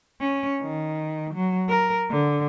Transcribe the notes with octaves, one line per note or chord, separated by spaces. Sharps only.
C#4
D#3
F#3
A#4
D3